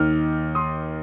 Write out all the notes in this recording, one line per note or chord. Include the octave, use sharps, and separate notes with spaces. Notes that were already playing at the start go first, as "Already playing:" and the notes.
Already playing: D#2 D#3 F6
C6 D#6